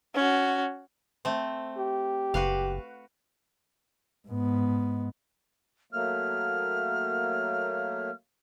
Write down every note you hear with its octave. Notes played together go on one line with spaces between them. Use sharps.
C#4 F#4
A3 C4
G4
F#1 F#4 B4 F5
G#2 B3
F#3 A3 A#3 F6